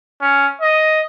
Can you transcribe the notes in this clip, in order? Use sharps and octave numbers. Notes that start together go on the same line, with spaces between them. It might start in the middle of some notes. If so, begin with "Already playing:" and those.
C#4
D#5